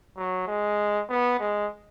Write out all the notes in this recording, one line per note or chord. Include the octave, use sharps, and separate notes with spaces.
F#3
G#3
B3
G#3